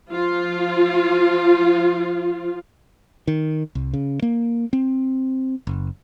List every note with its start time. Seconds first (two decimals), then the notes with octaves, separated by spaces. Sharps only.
0.11 F3 F4
3.28 D#3
3.75 C2
3.93 C#3
4.22 A#3
4.73 C4
5.67 F#1